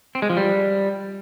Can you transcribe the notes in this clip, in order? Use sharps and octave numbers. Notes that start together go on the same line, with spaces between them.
C4
G#3
F3
G3